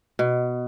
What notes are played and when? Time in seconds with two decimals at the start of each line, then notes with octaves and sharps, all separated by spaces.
0.19 B2